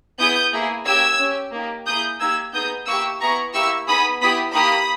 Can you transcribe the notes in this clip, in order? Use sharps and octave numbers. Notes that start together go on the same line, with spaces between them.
B3 E4 G#4 D#6 G6
A#3 E4 G#4
A#3 C#4 G4 E6 G#6
C#4 G4
A#3 D#4 G4
A#3 E4 G#4 D#6 G6
A#3 D#4 G4 E6 G#6
B3 D#4 G#4 D#6 G6
A#3 E4 G4 C#6 E6
B3 E4 G#4 A#5 C#6
A#3 E4 G4 C#6 E6
B3 D#4 G#4 B5 D#6
B3 E4 G4 B5 D#6
A#3 D#4 G4 B5 D#6